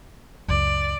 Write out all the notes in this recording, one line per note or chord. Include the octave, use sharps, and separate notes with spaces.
C#2 F#2 D5